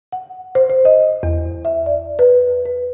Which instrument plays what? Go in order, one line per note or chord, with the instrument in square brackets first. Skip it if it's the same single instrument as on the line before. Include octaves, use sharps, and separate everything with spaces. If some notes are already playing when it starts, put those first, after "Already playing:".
[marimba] F#5
C5
C5
D#5
E2
E5
D5
B4
B4